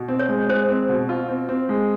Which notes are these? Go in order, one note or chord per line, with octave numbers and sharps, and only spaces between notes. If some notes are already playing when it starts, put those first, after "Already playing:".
Already playing: B2
C4
C#5
G#3
G#3 C5
C4
B2
F4
C4
C4
G#3